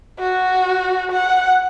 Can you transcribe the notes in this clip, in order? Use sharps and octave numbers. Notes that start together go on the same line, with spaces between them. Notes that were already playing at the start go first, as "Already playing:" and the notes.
F#4
F#5